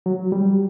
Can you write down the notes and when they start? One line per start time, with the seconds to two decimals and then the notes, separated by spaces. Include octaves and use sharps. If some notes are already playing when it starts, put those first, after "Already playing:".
0.06 F#3
0.32 G3